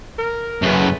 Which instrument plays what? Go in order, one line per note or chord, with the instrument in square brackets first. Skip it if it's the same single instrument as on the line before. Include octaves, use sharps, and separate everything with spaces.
[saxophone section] A#4
[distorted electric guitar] F#2 C#3 [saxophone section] A3 G#4 B4